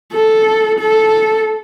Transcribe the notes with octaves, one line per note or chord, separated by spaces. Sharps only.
A4
A4